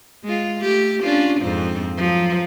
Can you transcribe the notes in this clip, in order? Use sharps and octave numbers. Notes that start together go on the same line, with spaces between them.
G#3 F4
A3 G4
C#4 D4 F4
F2 G#2 C4
F3 F#3